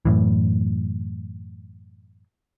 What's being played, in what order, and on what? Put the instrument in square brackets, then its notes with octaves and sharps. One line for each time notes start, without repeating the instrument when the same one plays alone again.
[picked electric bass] F#2 A2 E3